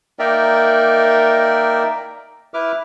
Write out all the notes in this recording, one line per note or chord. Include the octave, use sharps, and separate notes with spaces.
A#3 D#4 A#4 D5 E5 G5
E4 B4 E5 D6 F6